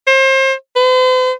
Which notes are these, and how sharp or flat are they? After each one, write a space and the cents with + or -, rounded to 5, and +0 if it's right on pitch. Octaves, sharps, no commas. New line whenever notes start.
C5 +35
C5 -45